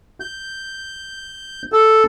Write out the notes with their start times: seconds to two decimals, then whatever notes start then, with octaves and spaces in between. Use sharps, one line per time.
0.20 G6
1.72 A4